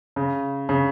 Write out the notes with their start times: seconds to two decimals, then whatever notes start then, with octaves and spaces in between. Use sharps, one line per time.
0.16 C#3
0.69 C#3